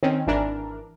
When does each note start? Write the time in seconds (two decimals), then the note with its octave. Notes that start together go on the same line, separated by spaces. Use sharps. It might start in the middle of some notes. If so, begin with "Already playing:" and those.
0.03 D#3 C4 C#4
0.27 G#1 E3 D4 A#4